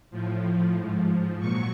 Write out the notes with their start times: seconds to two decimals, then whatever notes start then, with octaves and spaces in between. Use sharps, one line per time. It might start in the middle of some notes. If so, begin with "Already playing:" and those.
0.11 A2 F3
0.76 G#2 F3
1.39 A#2 F#3 C#6